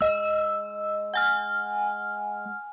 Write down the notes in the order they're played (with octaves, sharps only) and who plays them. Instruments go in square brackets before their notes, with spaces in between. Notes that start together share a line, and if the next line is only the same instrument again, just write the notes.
[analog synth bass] G#3 [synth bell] D#5 E6
[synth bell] F#5 G#5 F6